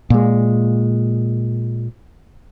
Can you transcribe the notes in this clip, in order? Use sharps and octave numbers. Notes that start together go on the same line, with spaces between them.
A#2 G#3